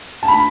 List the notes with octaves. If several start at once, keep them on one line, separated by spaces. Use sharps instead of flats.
A5
B5